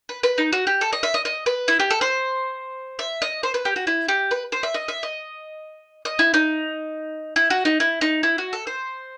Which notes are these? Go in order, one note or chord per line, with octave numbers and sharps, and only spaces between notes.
B4
B4
D#4
F#4
G4
A4
D#5
E5
D#5
D#5
B4
E4
G4
A4
C5
E5
D#5
C5
B4
G4
F#4
E4
G4
B4
C5
E5
D#5
E5
D#5
D#5
E4
D#4
E4
F#4
D#4
E4
D#4
E4
F#4
A4
C5